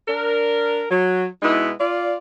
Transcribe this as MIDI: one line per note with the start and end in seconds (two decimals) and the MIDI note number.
0.08 0.85 62
0.08 0.85 70
0.90 1.25 54
1.42 1.70 47
1.42 1.70 56
1.42 1.70 59
1.42 1.70 63
1.42 1.70 64
1.80 2.16 65
1.80 2.16 74